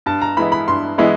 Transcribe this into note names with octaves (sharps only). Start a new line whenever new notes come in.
G2 A5
A#5
E3 G#3 B3 E4 B5
B5
G2 C6
E3 G#3 B3 E4